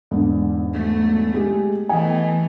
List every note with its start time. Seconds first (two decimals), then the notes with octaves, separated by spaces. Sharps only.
0.11 E2 G#2 D3
0.73 F#3 A3
1.34 G#3 G4 G#4
1.89 E3 A3 B3 D#5 G#5